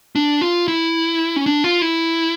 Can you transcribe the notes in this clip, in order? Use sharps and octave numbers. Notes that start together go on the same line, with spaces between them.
D4
F4
E4
C#4
D4
F4
E4